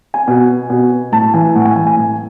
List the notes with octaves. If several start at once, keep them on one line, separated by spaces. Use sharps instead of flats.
G#5
B2
B2
A2 A5
E3 G#5
A2 F#5
G#5
E3 G#5
G#5
A2